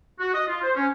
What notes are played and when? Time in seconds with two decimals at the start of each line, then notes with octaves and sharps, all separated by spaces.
0.19 F#4
0.34 D#5
0.48 F4
0.63 C5
0.76 C#4